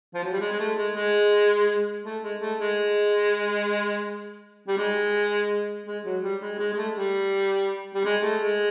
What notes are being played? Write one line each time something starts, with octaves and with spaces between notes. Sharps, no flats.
F3
F#3
G3
G#3
G#3
A3
G#3
G#3
A3
G#3
A3
G#3
G3
G#3
G#3
F#3
G3
G#3
G#3
G#3
A3
G3
G3
G#3
A3
G#3